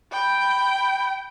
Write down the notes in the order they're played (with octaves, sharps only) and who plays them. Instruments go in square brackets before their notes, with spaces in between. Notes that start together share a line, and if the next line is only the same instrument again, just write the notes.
[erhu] G5 [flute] B5